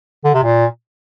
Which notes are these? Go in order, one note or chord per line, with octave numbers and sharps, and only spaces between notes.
D3
C3
A#2